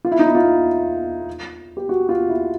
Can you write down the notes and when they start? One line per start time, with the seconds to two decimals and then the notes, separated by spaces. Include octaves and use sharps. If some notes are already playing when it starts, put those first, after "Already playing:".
0.05 F4
0.11 E4
0.19 D#4
0.26 E4
0.35 F4
1.77 G4
1.89 F#4
2.09 F4
2.29 E4